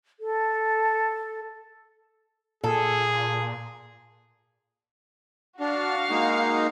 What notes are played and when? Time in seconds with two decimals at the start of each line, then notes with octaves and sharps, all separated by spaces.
0.19 A4
2.64 A#2 G#4 A4
5.60 D4 F#4 F5
6.10 G#3 A#3 D#4